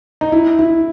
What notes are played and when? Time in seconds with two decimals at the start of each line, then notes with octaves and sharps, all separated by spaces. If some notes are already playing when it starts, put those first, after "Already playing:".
0.21 D#4
0.32 E4
0.59 E4